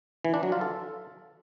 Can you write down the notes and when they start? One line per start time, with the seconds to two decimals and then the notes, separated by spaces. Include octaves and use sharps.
0.25 E3
0.34 D4
0.43 F#3
0.52 F4
0.61 A4